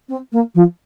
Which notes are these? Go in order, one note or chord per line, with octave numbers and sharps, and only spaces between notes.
C4
A#3
F3